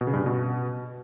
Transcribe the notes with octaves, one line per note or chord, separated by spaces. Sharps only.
B2
C#3
G2
C#3
B2